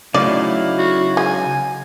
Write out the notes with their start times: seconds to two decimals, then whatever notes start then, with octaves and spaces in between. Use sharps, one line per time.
0.14 C#3 F#3 A3 D#4 E4 D5 F5
0.78 F#4
1.17 G#3 G#5